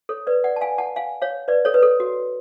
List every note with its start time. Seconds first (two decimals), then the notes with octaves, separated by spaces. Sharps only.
0.09 A4 C#5
0.27 B4 D5
0.44 D5 F#5
0.56 A5
0.61 F5 G#5
0.78 F#5 A5
0.96 F5 G#5
1.22 C#5 F5
1.48 B4 D5
1.65 A4 C#5
1.74 B4
1.83 A4
2.00 F#4